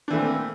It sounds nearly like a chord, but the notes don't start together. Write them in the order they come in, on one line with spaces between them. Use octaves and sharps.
D4 E3 A3 C4 A#3